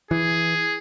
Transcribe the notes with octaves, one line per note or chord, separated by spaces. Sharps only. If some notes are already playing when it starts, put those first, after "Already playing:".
E3 G#4